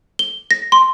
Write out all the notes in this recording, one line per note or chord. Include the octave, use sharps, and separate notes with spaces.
G7
A#6
C6